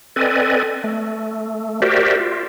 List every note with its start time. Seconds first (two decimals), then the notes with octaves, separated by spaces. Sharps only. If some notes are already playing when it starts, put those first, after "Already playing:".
0.16 C4 A4 B4 D5 D#5 G#5
0.84 A3
1.82 F#4 G4 A#4 C5 D5 E5
2.20 F4